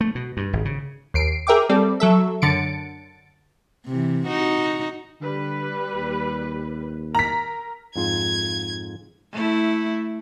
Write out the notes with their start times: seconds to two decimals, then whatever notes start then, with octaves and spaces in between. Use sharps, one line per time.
0.01 A3
0.15 B2
0.37 G2
0.53 G#1
0.65 C#3
1.14 D#2 C7 D7
1.47 G#4 A#4 E5 G5 D6
1.69 G3 C4 A4 D5
2.00 F#3 A4 E5
2.42 F#2 D3 A6 C#7 D7
3.85 C3 E3
4.27 D#4 F#4
5.21 D3 G3 B4
5.95 D#2
7.15 A#4 A#5 B6
7.96 F2 G#2 F4 G#6
9.32 A3 E4